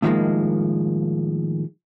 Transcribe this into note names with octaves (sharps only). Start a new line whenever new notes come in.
A2 D#3 F3 F#3 G#3 A#3